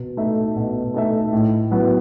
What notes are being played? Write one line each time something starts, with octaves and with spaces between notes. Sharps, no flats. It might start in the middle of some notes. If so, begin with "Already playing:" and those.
Already playing: B2
A3 D#4 A4 E5
B2
A3 D#4 A4 E5
A2
F#3 B3 E4 B4